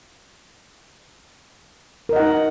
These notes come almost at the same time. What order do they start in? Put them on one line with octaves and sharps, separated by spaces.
A#4 D#5 F#5 D#4